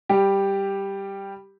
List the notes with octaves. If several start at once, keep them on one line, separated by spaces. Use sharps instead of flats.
G3 G4